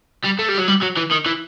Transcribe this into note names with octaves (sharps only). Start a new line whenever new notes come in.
G3
A3
G3
F#3
G3
F#3
E3
D#3
E3